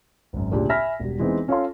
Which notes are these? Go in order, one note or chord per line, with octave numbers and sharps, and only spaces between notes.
G#1 F#2
D2 A#2 C#3 D4 G4
E5 G#5 B5 F6 A#6 B6
E1 G3
E3 G#3 B3 C4 D#4
C#4 F4 A4 C#5 F5 C6